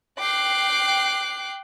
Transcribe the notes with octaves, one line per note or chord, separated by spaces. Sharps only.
G5 D6 F#6 C7